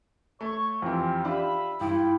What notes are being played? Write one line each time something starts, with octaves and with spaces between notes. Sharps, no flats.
A3 C#5 C#6
F2 E3 C4 F4 G4
D4 F4 G4 E5 B5
G2 E4 F4 G4 G5